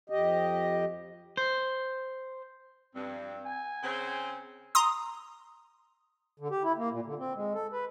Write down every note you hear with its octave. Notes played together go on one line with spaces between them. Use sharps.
F2 G4 D#5
C5
G2 C4
G#5
C#3 C4
A#5 C6 D#6
D3
G4
E4
A#3
A#2
D3
C4
G#3
A4
B4